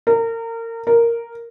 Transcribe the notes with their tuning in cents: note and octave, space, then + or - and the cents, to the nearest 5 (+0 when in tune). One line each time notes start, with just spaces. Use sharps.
A#4 -30
A#4 -5